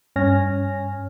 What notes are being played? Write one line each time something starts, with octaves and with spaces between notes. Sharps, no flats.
G2 C#4 C#5 G#5 F6 A#6